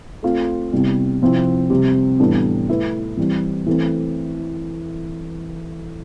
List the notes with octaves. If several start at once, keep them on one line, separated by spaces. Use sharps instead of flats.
A3 C4 F4
C3 G3 B3 E4
C3 F3 C4 E4
C3 G3 C4 G4
A2 E3 G3 B3 D4
A3 E4 B4
E3 G3 C4
E3 A3 C4